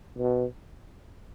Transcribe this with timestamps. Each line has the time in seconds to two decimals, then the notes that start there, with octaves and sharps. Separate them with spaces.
0.18 B2